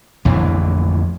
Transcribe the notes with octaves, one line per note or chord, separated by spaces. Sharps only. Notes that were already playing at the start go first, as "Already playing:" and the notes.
A1 F2 D3 E3